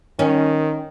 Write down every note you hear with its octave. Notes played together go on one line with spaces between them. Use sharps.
D#3 C#4